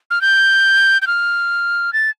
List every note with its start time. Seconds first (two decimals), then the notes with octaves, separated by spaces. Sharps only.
0.11 F6
0.21 G6
1.02 G6
1.07 F6
1.93 A6